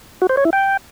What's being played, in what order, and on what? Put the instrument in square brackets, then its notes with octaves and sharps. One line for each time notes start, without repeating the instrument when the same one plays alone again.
[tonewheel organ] F#4
C5
C#5
E4
G5